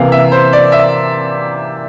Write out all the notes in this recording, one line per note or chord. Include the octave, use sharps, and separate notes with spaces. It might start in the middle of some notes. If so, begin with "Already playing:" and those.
Already playing: C3 E3 A#3 F5
E5
C5
D5
E5